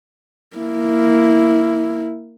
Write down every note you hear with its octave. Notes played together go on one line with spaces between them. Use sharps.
A#3 E4